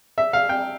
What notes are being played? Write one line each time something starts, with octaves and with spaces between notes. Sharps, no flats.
E5
F5
G5